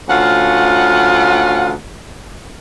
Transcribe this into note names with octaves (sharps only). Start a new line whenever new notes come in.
D2 C#4 F4 F5 F#5